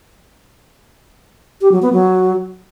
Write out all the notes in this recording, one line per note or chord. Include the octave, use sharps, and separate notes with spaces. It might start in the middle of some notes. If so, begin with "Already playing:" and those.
G4
F#3
B3
F#3